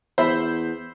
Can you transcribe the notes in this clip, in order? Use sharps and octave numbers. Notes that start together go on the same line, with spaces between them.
E2 C5 E5 B5